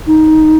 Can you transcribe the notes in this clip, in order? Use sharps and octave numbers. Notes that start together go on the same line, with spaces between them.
D#4